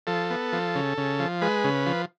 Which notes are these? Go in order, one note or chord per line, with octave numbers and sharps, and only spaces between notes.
F3 A4
B3
F3
C#3
C#3
F3
G#3 B4
C#3
F3